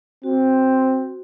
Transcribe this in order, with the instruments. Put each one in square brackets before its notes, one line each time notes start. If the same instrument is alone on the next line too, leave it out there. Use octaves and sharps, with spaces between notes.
[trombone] C4 [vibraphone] F#4